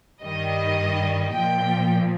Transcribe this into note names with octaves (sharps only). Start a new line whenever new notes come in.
G2 D#3 G3 D#5
A#2 F3 G5